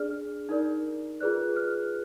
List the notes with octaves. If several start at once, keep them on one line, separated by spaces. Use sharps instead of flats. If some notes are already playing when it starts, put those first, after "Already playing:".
Already playing: D4 G#4 D5 F6
D#4 A#4 D5
F4 G#4 B4 D5 F#6
F6